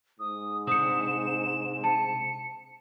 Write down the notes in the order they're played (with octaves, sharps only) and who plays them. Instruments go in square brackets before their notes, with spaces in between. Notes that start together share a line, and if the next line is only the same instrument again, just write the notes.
[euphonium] G#2 [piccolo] D#6
[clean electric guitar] C3 C4 D4 [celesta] D#6 C#7 [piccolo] E7
[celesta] A5 [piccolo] C#7